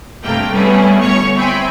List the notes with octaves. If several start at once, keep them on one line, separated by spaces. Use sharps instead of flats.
G2 C3 A3 A#3 G5
G3 A3 B3 C#4 E4 G#4
G1 C#5 C#6
C4 E4 G5 G#5 B5